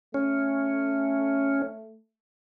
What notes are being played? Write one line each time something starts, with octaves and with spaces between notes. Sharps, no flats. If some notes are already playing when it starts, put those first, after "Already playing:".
A3 C#4